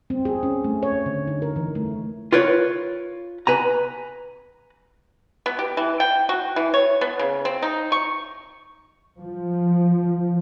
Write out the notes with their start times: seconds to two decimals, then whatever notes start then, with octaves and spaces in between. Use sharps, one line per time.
0.10 C4
0.25 G#4
0.43 C#4
0.64 A3
0.83 C#5
1.06 D3
1.27 D#4
1.42 A#4
1.56 E3
1.75 A3
2.32 F4 A#4 B4 C#5
3.47 B4 G#5 A#5
5.46 B3
5.59 G4
5.77 E3
6.00 G5
6.29 F#4
6.56 E3
6.74 C#5
7.01 B3
7.19 C#3
7.45 C4
7.62 D#4
7.92 C#6
9.20 F3